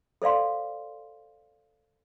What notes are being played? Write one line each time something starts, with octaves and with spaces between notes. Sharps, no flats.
A4 C5 D5 F5 C6